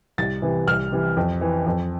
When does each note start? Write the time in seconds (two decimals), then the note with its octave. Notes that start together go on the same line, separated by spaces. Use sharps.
0.18 C2 A6
0.42 C3 E3
0.67 C2 F6
0.92 C3 E3
1.17 F2
1.41 E3
1.66 F2